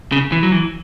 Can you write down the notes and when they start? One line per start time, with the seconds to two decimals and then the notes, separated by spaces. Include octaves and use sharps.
0.12 C#3
0.32 E3
0.43 F#3
0.52 E3